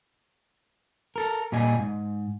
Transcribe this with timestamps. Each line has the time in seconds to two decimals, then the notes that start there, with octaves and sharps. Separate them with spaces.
1.16 A4 A#4
1.52 A#2 G3 D#5 G#5
1.79 G#2